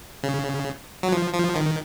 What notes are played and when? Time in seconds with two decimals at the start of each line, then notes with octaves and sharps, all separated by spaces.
0.23 C#3
1.03 F#3
1.12 F3
1.34 F3
1.56 D#3